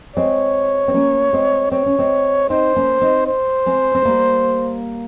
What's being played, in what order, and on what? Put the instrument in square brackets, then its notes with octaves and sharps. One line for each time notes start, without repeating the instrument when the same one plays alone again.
[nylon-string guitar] G#3 C4 [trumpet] C#5
[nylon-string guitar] C4
A#3 C#4
G#3 C4
[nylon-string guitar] C4 [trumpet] C#5
[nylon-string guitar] C#4
G#3 C4
[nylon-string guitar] C4 D#4 [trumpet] C5
[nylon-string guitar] A#3 C#4
C4 D#4
[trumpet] C5
[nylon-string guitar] G#3 C4
C4
G3 A#3